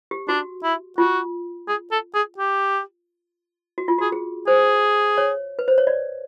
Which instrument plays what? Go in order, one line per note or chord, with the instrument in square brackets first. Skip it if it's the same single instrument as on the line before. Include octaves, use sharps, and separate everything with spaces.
[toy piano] G4
[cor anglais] D4 [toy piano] F#4
[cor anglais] E4
[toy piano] F4 [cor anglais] F#4
[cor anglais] G#4
A4
G#4
G4
[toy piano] F#4
F4
[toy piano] F#4 [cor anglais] G#4
[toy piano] G#4
[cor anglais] G#4 [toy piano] C5
[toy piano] C#5
B4
C5
C#5
D5